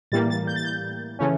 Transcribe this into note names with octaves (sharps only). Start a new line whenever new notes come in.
A2 E3 G3 A#3 A6
A6
G6
A6
G6
C#3 E3 A3 C#4